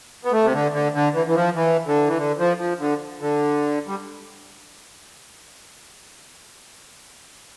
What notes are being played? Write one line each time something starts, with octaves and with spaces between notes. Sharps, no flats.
B3
A3
C3
D3
D3
D3
E3
E3
F3
E3
D3
E3
D3
F3
F3
D3
D3
G3